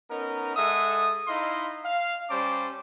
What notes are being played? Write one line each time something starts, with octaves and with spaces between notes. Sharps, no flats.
B3 C#4 D#4 A#4
G#3 A4 E5 F#5 D#6
D#4 E4 D#5 F5 C6
F5
G3 C#4 C5 A5 D6